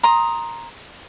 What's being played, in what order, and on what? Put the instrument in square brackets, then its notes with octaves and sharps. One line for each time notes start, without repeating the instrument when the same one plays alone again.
[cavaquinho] A#5 C6 D#6